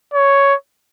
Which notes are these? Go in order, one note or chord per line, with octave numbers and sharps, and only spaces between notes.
C#5